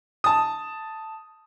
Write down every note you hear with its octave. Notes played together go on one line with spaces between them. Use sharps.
A5 D#6